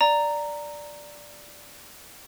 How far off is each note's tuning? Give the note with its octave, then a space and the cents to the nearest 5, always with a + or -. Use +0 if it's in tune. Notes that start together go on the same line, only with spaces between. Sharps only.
D5 +0 A#5 -10